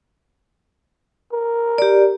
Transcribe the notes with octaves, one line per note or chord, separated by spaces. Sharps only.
A#4
G4 D5